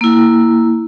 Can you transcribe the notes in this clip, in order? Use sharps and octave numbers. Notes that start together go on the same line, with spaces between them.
A#3 E4